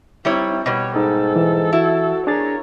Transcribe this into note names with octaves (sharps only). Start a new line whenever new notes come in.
G3 C4 D#4 E4 C#5
B2 G3 C#5
G#2 D#4 A4
E3
E4 F#4
D4 G#4 A#4 C#5 A6